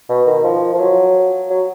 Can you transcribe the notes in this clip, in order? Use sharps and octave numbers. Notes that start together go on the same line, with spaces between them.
B2
D#3
F3
F3
F#3
F#3